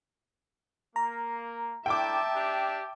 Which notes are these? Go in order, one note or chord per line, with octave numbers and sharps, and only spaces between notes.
A#3 A#5
A3 D4 E4 E5 G5 A5 D6
D4 G4